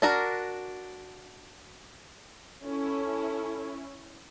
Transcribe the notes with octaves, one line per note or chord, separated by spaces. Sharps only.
D4 F#4 A#4
C#4 E4 A4